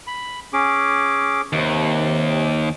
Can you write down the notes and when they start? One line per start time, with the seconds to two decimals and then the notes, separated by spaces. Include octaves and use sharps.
0.07 B5
0.53 C#4 G#4 D6
1.53 D#2 C3